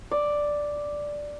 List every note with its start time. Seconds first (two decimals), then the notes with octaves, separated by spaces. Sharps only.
0.11 D5